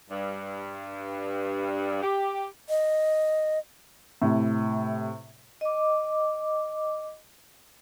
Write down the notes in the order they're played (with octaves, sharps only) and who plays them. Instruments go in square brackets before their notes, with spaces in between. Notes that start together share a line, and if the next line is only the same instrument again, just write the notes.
[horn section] G2
G4
[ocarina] D#5
[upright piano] A2 C3
[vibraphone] D#5 D6